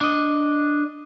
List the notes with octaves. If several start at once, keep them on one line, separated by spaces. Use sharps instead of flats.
D4 D#5